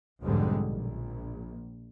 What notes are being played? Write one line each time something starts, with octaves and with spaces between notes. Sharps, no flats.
B1 F2 G#2 D3 G3 G#3
A#1